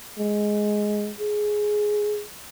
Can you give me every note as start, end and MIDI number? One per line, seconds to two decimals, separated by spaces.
0.19 1.11 56
1.20 2.24 68